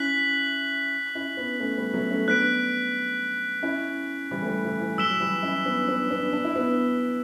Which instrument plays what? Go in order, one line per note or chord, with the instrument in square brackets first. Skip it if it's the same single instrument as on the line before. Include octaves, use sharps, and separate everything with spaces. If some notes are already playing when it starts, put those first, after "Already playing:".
Already playing: [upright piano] C#4 E4 [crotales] F#6 B6 F#7
[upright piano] C#4 E4
B3 D4
A3 C#4
G3 B3
F#3 A3
A3 C#4
[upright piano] B3 D4 [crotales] F#6 B6 D7
[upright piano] C#4 E4
E3 G3
A3
E3 G3
E3
E3
[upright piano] F#3 [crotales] E6 B6 E7 G7
[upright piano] F#3
E3 G3
C#4 E4
B3 D4
B3 D4
B3 D4
D4
E4
B3 D4